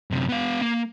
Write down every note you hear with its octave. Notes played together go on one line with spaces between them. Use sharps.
F#2 C3
B3 F5
A#3